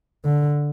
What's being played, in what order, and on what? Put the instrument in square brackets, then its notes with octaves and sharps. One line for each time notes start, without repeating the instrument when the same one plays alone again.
[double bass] D3